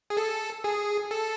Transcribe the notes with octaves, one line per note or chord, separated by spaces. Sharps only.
G#4
A4
G#4
A4